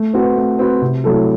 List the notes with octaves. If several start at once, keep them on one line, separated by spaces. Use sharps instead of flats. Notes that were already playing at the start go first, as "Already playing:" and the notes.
Already playing: A3
C4 F#4 B4
A3
C4 F#4 B4
C3
F#3 A3 E4 A4